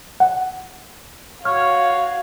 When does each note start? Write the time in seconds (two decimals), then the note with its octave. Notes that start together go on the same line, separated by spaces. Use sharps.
0.20 F#5
1.45 F#4 C#5 F5 F6